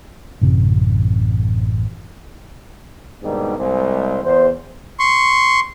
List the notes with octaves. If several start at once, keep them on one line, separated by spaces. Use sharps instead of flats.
A1 F#2 C3 C4
G#2 B2 D#3 G3 A#3 D4
C2 G#3 C5
E2 C5
C6 C#6